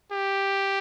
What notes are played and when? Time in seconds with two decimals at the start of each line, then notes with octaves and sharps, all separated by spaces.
0.12 G4